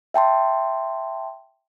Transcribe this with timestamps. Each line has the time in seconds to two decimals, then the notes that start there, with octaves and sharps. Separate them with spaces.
0.14 E5 G5 A5 C6